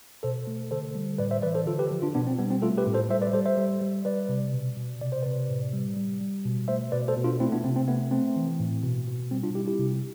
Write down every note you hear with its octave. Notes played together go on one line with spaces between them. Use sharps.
B2 A4 C5
A3
D3 A4 C5
G3
A2 B4 D5
C5 E5
E3 B4 D5
A4 C5
D3 F4 A4
G4 B4
F3
D4 F4
B2 B3 D4
C4
G3 B3
C4
A3 F4 A4
G4 B4
A2
A4 C5
G3 C5 E5
B4 D5
G3 A4 C5
C5 E5
G3
G3
G3 B4 D5
C3
B2
B2
C3 D5
C5
C3 B4 D5
A2
G3
G3
G3
B2
A3 C5 E5
B2 B4 D5
A4 C5
B2
D4 F4
A3 C4 E4
B3 D4
C3 C4
C4
A3 B3
A3 C4
E3
A2
B2
B2
G3 C4
D4 F4
G3 E4 G4
E4 G4
C3